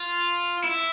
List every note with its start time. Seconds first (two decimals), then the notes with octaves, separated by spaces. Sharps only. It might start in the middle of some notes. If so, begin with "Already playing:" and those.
Already playing: F4
0.64 E4